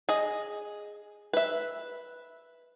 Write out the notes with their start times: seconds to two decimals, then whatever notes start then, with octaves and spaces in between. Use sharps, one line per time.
0.09 G#4 D#5
1.33 B4 E5